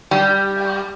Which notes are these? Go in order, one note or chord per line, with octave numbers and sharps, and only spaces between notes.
G3